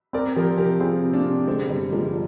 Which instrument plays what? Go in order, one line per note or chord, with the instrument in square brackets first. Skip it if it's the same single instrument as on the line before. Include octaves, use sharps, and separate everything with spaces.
[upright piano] C4 [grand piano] A#4 D5
[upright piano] F3 [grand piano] G4 A#4
[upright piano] C3 [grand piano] G4 A#4
[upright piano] C4 [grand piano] F4 G#4
[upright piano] C3
[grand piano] A#3 D4
[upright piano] C3
[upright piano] D3 [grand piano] G#3 C4
[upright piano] G1 [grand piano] G3
[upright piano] G1 [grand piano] F3 G#3